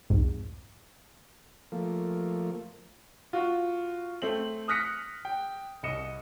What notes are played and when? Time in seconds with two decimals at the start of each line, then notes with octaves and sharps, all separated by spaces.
0.10 C2 F2 G#2
1.72 F3 A3 A#3
3.33 F4 F#4
4.22 A3 C4 F#7
4.68 D#6 F6 F#6 A#6 B6 C#7
5.25 G5
5.83 C2 D#5 C#7 E7